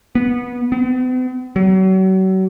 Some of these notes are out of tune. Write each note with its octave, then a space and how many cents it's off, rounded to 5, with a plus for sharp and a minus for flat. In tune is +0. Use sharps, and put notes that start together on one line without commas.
B3 -20
B3 +45
F#3 +35